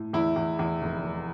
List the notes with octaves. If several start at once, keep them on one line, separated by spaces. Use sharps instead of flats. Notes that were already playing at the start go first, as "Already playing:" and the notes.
Already playing: A2
E2 E4
E2
E2
F1
F1